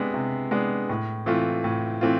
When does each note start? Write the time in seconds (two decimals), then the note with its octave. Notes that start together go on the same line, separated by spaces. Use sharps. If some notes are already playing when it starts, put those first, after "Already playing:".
Already playing: C3 G#3 B3 D4
0.14 C3
0.51 G#3 B3 D4
0.89 A2
1.26 E3 A3 C4 F4
1.64 A2
2.01 E3 A3 C4 F4